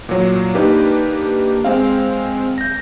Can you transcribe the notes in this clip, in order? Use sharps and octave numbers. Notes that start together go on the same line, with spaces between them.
A#2 F#3
A#3 D4 D#4 G4 B4
G#3 C4 F5
G6 A#6